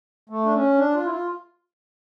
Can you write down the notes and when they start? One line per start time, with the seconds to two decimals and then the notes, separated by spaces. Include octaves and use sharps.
0.29 A3
0.45 D4
0.54 C#4
0.78 D4
0.94 F4
1.05 E4
1.10 F4